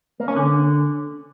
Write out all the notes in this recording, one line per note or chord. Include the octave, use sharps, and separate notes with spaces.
A#3
C#4
D3